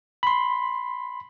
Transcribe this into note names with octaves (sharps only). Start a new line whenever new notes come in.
B5 C6